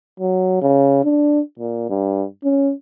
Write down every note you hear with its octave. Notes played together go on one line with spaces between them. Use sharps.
F#3
C#3
D4
A#2
G2
C#4